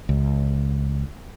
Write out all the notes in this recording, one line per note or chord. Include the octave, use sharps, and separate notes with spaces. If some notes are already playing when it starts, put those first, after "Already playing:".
C#2